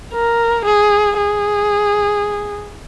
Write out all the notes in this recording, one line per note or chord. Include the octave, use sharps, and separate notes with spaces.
A#4
G#4
G#4